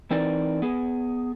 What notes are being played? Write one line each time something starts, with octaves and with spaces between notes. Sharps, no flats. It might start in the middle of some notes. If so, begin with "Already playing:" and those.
E3 C4 D#4 A#4 D5
B3 G#4